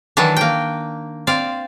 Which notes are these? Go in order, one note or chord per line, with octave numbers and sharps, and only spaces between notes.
D#3 E3 F#3 D4
A#3 G5
C4 D5 F5